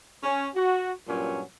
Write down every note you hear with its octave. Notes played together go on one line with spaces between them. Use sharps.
C#4
F#4
G2 A#2 F#3 C#4